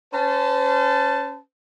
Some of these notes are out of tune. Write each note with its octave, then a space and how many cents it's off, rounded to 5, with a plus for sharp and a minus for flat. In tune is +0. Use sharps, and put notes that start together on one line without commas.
C#4 +0 C5 -40 A5 +0